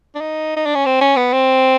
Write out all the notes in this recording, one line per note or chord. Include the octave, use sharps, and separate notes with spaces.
D4
D#4
D#4
D4
C#4
C4
C#4
B3
C4